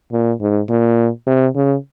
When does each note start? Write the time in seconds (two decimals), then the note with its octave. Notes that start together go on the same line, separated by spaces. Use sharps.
0.12 A#2
0.41 G#2
0.69 A#2
1.27 C3
1.56 C#3